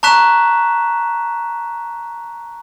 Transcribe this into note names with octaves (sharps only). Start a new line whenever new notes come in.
A5 A#5 C#6 F#6 B6 E7